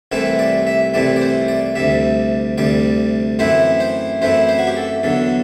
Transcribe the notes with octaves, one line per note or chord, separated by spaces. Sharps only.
C2 C3 E3 A3 C4 E5
D5
E5
C2 C3 E3 A3 C4 D5
D5
C5
D5
D2 C3 G3 E5
D2 C3 G3 D5
F#2 E3 A3 C4 E4 C5
C5
F#2 E3 A3 C4 E4 C5
C5
F#4
G4
A4
E2 D3 F#3 A4